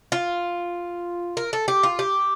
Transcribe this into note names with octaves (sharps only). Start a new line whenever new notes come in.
F4
A#4
A4
G4
F4
G4